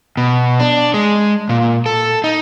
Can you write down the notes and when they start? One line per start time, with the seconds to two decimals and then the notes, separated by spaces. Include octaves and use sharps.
0.17 B2
0.60 D4
0.94 G#3
1.49 A#2
1.86 A4
2.24 D#4